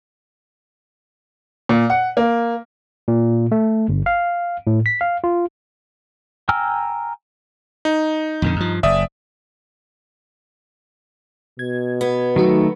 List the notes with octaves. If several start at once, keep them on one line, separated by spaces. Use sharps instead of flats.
A#2
F#5
A#3
A#2
A3
G1
F5
A2
B6
F5
F4
G5 G#5 A#5 E6 F6
D#4
F2 A#2 D3
G2 F3
F#1 D5 E5 D#6
B2 G#6
B3
D#3 F#3 A3 D#4 F#4